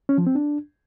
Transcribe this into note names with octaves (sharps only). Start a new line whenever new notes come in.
C#4
F3
C4
D4